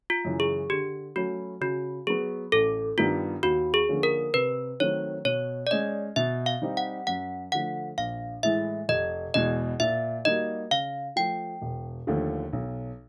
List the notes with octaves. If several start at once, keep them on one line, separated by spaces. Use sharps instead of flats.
F4
F#2 C#3 E3
G#4
D3 G4
F#3 A3 C#4 F#4
C#3 F#4
F#3 B3 G#4
A1 A4
G2 D#3 G3 B3 F4
D#2 F#4
G#4
D3 F3 A#3 C#4
A#4
C3 B4
D#3 F#3 A3 C4 C#5
B2 C#5
D5
G#3 C#4 D#5
B2 E5
F5
G3 C4 D#4 G4
F#5
F#2 F#5
D3 F3 A3 F#5
A#1 F5
A2 E3 G#3 E5
F1 D#5
E2 B2 G#3 D#5
A#2 E5
G3 A#3 D#4 F#4 D#5
C#3 F5
F3 A3 G5
E1
D#2 D3 F3 A3
B1